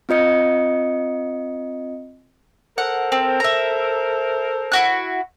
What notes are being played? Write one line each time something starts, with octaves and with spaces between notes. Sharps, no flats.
C4 F4 D#5 C#7
A4 A#4 C5 F#5
C4
E5 A#5
E4 F#4 F#6